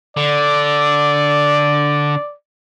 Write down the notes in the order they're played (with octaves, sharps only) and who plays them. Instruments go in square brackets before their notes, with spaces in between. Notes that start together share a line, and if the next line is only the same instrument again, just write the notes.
[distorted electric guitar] D3 [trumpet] D5